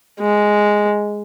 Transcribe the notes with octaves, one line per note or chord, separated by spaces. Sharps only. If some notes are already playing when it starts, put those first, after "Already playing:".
G#3